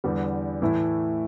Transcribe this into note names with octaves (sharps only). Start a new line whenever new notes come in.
E2 D3 G3 B3
A2 E3 A3 E4